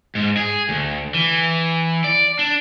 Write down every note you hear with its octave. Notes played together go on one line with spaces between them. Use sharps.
G#2
G#4
D2
E3
D5
D4